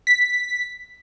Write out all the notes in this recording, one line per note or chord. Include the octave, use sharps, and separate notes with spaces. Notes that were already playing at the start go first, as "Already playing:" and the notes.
B6